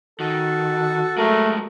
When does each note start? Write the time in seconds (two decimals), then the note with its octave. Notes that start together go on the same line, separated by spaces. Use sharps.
0.20 D#3 F#4 A4
1.18 F#3 G#3 A3 A#4